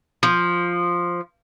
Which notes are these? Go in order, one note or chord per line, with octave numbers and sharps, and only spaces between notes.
F3